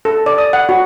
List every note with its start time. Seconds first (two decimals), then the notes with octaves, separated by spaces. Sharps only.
0.05 A4
0.26 D5
0.38 D#6
0.53 F#5
0.69 F#4